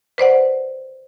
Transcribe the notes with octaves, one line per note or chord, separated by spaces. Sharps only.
B4 C5 D5 F#5